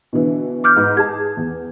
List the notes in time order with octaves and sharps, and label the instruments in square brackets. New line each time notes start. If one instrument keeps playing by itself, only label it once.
[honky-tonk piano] B2 D3 E3
[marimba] D6 F6 G6
[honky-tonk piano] G#2 B4
[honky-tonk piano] G#4 A5 [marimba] G#6
[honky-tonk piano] E2